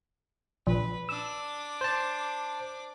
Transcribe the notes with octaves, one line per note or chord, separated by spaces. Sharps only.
A#1 B4
D4 D6 E6
C5 A5